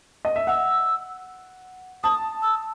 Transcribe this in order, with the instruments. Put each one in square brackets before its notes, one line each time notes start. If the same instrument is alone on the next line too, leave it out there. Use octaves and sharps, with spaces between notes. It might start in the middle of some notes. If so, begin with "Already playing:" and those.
[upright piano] D#5
E5
[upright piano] F#5 [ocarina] E6
[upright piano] A5 [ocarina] D#6
[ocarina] E6